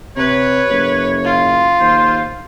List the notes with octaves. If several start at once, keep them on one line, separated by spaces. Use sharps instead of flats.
C3 B4 C#5
F#1
F4
D#2 C5